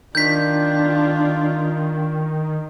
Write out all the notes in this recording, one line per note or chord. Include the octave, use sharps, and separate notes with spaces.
D#3 D4 F4 G6 B6